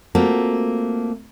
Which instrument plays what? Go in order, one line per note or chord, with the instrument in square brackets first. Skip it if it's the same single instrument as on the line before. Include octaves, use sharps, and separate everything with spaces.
[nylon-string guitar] A3 A#3 C4 F4 F#4